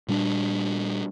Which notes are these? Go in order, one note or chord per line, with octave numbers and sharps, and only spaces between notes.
A#2 G3 B3 D4